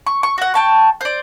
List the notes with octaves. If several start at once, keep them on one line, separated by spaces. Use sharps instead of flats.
C#6
C#6
F#4 F#5
G5 A5 C#6
C5 D5